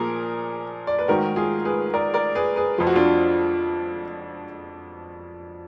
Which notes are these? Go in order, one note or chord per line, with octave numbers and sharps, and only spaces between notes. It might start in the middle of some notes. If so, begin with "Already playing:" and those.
Already playing: A#2 F3 G#4 A#4
D5
B4
G#2 D#3 F#4 A#4
F4 G#4
G#4 B4
A#4 D5
A#4 D5
G#4 B4
G#4 B4
F2 F3 F4
F#4
D4 F4